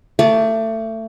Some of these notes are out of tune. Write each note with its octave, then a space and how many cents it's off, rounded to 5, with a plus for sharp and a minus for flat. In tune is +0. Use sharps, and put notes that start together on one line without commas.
A3 +25 A5 -30 D6 +0